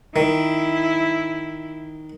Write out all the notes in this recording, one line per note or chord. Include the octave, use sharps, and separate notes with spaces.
D#3 E4